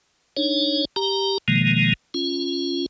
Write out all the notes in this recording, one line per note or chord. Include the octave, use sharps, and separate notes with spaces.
D4 D#4 C#5
G4 A#5
B2 D#3 F3 G#3 A#3
C#4 F4